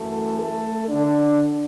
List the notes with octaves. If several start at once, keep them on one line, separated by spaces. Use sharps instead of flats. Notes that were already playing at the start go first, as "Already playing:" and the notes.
Already playing: F#2 E3 A3 A4
A3 A4
D3 D4